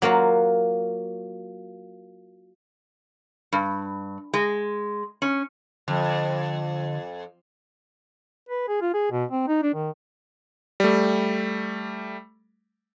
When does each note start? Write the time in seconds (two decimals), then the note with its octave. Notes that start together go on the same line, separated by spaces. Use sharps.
0.02 F#3 A#3 F4 F#4
3.53 G2
4.34 G#3
5.22 C#4
5.88 F2 D3
8.49 B4
8.68 G#4
8.82 F4
8.94 G#4
9.11 B2
9.32 C4
9.48 D#4
9.63 D4
9.74 D#3
10.80 G3 A3